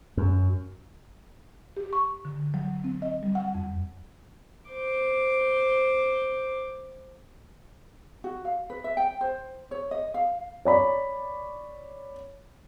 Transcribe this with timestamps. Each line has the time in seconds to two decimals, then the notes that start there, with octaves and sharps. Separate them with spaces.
0.17 F#2
1.77 G4
1.93 C#6
2.25 D3
2.54 F#3
2.84 C4
3.02 D#5
3.23 G3
3.35 F#5
3.54 F2
4.70 C5 D6
8.24 F#4
8.45 F5
8.70 B4
8.84 E5
8.97 G5
9.21 C5
9.71 C#5
9.91 D#5
10.14 F5
10.65 C#5 D5 B5